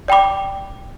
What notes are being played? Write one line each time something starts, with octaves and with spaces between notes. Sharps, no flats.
D5 G5 B5 D6